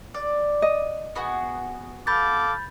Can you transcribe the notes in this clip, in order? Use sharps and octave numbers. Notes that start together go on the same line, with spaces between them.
D5
D#5
B3 F#4 G#4
A4 F5 B5 D6 G6 A6